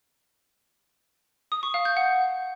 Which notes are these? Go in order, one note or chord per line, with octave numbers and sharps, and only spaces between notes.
D#6
C#6
F5
G6
F#5